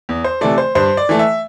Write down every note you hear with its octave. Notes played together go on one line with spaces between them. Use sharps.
E2
C5
C3 E3 A3 D5
C5
G2 C5
D5
E3 A3
E5